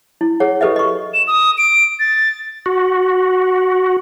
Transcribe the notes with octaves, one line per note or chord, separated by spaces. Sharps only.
E4
G#4 C#5 F#5
G4 A4 B4 D#5 E5
D#5 C#6
E7
D#6
D7
A6
F#4